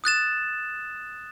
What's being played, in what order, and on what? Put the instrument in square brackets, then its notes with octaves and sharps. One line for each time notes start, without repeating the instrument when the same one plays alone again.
[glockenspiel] D#6 F#6 A6 E7